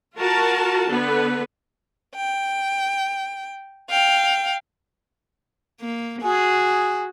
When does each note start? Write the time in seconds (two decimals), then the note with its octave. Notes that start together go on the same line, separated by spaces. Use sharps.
0.17 F4 F#4 A#4 A5
0.89 D3 B3 B4
2.16 G5
3.90 F5 G5
5.81 A#3
6.23 F#4 G#4